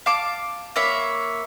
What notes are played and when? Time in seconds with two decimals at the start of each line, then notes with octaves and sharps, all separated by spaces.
0.06 F5 A5 D6
0.76 A#3 C#5 E5 B5